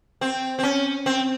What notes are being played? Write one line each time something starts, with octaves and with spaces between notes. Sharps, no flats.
C4
C4
C#4
C4